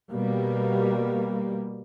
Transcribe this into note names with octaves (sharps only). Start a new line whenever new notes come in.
B2 G3 A#3